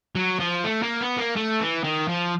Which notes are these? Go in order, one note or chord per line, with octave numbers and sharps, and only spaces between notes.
F#3
F3
A3
A#3
B3
A#3
A3
E3
D#3
F3